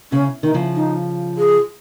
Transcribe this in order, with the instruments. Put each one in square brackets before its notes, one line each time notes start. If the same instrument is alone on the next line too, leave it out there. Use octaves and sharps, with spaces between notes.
[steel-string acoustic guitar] C#3 [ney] C#4
[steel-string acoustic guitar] D#3 [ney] D#4
[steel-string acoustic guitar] C#3 F3
[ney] D#4
G#4